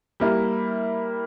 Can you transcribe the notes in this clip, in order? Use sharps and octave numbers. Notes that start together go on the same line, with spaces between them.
G3 A#3 E4